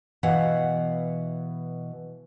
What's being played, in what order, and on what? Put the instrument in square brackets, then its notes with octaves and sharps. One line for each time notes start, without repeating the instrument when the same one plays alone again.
[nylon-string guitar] B2 E3 F5 F#5